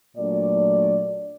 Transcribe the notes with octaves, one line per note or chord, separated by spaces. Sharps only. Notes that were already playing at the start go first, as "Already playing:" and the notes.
A#2 F#3 A3 D4 D5